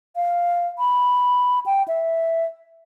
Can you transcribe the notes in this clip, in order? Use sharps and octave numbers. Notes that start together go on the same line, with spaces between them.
F5
B5
G5
E5